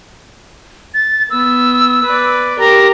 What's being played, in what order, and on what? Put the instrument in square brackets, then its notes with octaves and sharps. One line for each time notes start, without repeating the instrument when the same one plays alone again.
[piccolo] A6
[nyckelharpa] B3 [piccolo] E6
[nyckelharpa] B4 D5
[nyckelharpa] G4 A#4 [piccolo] A#5